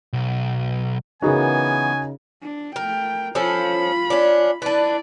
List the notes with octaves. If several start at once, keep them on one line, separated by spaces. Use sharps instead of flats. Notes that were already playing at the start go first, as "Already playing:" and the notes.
B1
C#3 E3 B3 D#4 F#4 G#4 A#4 G#5
D4
A3 A#4 G5
F3 C#4 F4 A4 B5
C#4 D4
D4 E4 B4 D5